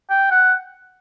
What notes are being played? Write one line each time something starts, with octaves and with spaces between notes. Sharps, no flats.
G5
F#5